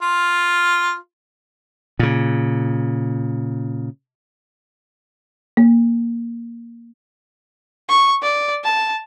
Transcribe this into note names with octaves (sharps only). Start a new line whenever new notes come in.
F4
A#2 C#3
A#3
C#6
D5
A5